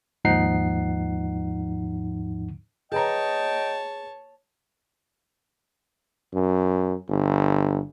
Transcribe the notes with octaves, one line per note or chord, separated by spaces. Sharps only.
D#2 G#2 F3 D#4 F#5 C7
G#4 B4 C#5 D#5 G5 A5 A#5
F#2
G1